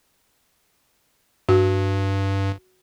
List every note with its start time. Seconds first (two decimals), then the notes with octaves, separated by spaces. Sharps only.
1.49 G2 F#4